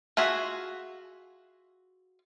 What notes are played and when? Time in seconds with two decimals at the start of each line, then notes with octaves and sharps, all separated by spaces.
0.17 F4 F#4 G#4 E5